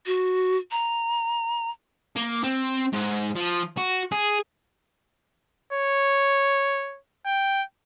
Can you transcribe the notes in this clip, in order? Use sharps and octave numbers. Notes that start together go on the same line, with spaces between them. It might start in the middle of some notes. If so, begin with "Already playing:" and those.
F#4
A#5
A#3
C4
G#2
F3
F#4
G#4
C#5
G5